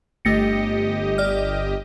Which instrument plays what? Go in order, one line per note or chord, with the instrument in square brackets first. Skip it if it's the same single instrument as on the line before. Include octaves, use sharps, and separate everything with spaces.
[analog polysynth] G1 G4 D#5 [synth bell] A3 A#6 C#7
[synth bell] D5 F6